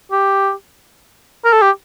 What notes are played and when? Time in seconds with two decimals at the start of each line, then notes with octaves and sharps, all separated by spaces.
0.11 G4
1.45 A#4
1.53 A4
1.62 G4